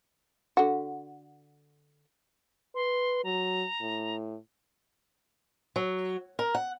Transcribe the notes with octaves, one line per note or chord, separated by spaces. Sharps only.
D3 F#4
B4 C6
F#3 A#5
A2
F#3
A#4
F#5